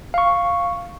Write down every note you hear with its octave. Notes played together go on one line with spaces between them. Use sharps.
F5 C#6